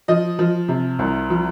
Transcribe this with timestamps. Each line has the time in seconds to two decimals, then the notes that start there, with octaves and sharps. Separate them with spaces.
0.08 F3 D#5
0.39 F3
0.68 C3
0.99 C2
1.30 F3